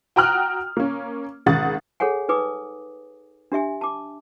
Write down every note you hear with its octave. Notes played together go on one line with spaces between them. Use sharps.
F#4 G5 A#5 D#6 F6 F#6
A#3 C#4
G#1 C#3 F#5 D#6 A6
G#4 A4 C#5 F#5 G#5
D#4 B4 G#5 D6 D#6
D4 G4 E5 G#5
A5 D6